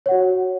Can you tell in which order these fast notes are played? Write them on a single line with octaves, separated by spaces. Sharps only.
C#5 F#5 F#4